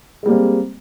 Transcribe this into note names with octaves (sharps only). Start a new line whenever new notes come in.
G3 G#3 A#3 C4